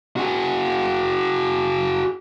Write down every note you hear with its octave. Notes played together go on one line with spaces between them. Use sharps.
F#4 G#4